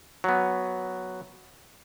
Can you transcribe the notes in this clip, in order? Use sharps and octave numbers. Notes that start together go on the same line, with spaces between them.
F#3 B3